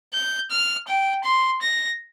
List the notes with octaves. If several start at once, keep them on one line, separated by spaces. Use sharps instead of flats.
G6
F6
G5
C6
A#6